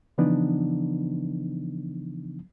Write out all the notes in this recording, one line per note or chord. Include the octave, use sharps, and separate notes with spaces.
C#3 E3 F3 B3 D4 D#4